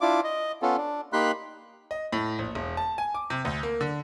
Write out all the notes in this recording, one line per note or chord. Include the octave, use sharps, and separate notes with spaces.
D4 E4 F4 D6
D#5
B3 C#4 F4 A4
D4
A#3 D#4 G4 B5 C6 F#6
D#5
A2
A#1
E1
A5
G#5
D6
C3
D2
A#3
D3